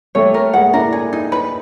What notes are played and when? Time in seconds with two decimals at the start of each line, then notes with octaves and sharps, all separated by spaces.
0.15 G3 A3 C#5
0.34 A#4
0.53 G#3 A#3 F#5
0.73 D4 E4 A#4
0.92 G#4
1.13 D#4
1.32 B4